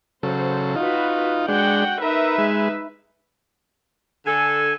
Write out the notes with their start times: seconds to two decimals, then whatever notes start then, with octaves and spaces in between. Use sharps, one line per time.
0.23 C#3 F#3 A4 C5
0.76 D#4 F4 F#4 B4
1.48 G#3 D4 F#4 F#5 G5
2.02 D#4 A#4 B4 E5
2.38 G#3
4.26 D3 A4 G#5